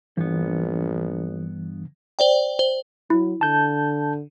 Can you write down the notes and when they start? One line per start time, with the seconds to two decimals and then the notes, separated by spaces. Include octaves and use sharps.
0.17 A#1 G2 E3 B3
2.19 C5 D5 G5
2.59 C5
3.10 F#3 E4
3.41 D3 A5 G6